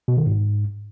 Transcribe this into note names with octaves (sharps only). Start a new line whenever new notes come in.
B2
D#3
G#2